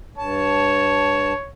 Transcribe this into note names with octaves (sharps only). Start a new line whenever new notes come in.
G2 C#5 A5